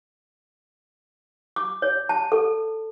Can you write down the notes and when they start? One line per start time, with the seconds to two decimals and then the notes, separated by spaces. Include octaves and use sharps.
1.56 D6
1.82 C#5
2.09 A5
2.32 A4